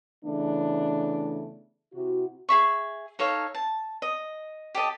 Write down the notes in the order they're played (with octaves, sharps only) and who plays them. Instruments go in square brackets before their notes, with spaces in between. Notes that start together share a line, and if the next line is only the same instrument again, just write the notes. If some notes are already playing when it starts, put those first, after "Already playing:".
[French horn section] C#3 E3 A3 B3 D4
C3 E4 F#4
[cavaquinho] G#4 E5 C#6
D#4 A4 C#5 F5
A5
D#5
G4 A4 D#5 A5